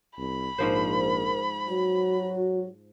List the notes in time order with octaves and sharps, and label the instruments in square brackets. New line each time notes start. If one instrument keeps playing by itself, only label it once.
[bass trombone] C2 [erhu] B5
[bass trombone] A#1 [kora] G#2 F3 C5 [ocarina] A#4
[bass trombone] F#3 [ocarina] F#4